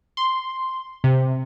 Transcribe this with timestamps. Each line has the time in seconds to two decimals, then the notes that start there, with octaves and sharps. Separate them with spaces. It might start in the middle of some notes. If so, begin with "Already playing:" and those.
0.17 C6
1.04 C3